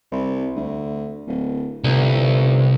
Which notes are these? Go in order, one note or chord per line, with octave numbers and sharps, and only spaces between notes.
C2
D2
D1
G1 C2